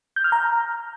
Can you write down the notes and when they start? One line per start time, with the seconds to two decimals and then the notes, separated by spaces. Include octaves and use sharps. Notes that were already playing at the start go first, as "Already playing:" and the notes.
0.16 G6
0.24 F6
0.32 A#5